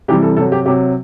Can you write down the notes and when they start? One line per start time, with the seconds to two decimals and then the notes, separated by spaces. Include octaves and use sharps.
0.08 C3 E3 G3 G4
0.22 A4
0.37 C3 F#3 A4
0.52 G4
0.66 C3 F#3 G4